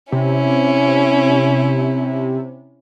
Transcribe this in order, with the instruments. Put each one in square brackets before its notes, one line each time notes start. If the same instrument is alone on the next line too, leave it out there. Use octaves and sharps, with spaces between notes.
[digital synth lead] C3 [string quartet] C#4 E4